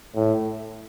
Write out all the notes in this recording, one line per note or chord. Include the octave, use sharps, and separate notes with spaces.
A2